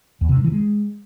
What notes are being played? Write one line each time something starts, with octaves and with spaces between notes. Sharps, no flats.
E2
C3
G2
E3
G#3